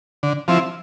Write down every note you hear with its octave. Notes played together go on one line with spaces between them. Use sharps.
D3
F3 C4 E4